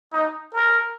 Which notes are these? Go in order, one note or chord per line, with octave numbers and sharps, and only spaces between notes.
D#4
A#4